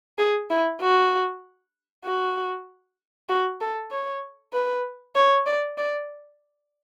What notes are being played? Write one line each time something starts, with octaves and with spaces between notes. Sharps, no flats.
G#4
E4
F#4
F#4
F#4
A4
C#5
B4
C#5
D5
D5